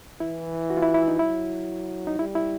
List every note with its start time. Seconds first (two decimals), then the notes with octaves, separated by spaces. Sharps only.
0.20 E3 E4
0.70 F#4
0.77 F4
0.82 E4
0.94 E4
1.08 D#4
1.19 F#3 E4
2.07 D#4
2.19 G3 E4
2.35 E4